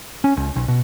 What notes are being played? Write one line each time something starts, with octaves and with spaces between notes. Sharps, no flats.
C#4
C#2
B1
B2